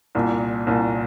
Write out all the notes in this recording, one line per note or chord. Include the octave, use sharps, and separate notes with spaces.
C2 A#2
C2 A#2